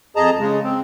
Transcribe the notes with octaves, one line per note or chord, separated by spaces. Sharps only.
F2 G#4 D#5 A5 A#5
C#3 G#3
C4